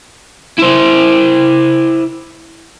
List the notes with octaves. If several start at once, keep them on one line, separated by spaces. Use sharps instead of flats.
E4 C5